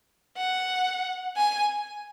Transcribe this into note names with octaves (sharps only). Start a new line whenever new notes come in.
F#5
G#5